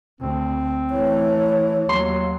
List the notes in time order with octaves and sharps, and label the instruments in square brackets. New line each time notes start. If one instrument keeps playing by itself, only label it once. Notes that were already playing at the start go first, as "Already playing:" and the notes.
[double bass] D2 [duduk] C4
[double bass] E3 A3 [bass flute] C#5
[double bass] D#2 [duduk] F#3 [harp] C6